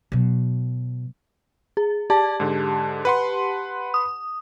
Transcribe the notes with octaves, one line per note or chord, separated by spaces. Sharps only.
B2 F#3
G#4
G4 D5 A5
G#2 D3
B4 F#5 C6
D#6